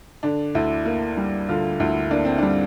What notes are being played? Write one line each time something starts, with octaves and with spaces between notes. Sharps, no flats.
D3 D4
D2 E4
A#3
G3
D3 F4
D2 E4
A#3 D4
C4
G3 D4